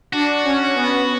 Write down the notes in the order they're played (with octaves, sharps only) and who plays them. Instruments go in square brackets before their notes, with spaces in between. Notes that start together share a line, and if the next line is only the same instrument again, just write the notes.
[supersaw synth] D4 [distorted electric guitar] F#4
[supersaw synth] C#4
B3